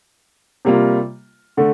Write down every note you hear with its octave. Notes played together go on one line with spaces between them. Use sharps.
C3 G3 A#3 F4
D3 A3